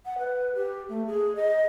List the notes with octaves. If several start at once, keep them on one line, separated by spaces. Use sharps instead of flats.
F#5
B4
G4
A3
G#4
D#5